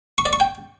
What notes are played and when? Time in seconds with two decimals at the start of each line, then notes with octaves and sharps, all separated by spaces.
0.18 C#6
0.26 D5
0.33 C#6
0.40 G5